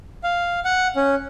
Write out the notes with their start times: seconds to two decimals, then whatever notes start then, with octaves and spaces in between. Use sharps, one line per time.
0.24 F5
0.65 F#5
0.96 C#4